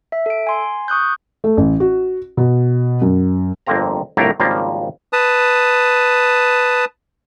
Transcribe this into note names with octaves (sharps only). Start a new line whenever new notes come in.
E5
A4 D7
G#5 C6
C#6 D#6 F#6 G6
A3
A1
F#4
B2
F#2
G1 F2 A#3 C4 A#5
G1 C2 A2 A3 A#3 A#4
G#1 C#3 F3 G3 A#3 F5
B4 A5 D#6